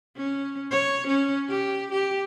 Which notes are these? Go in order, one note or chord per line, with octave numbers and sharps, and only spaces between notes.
C#4
C#5
C#4
G4
G4